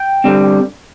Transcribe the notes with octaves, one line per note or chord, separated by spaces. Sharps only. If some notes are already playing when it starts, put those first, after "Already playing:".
Already playing: G5
D3 G3 C4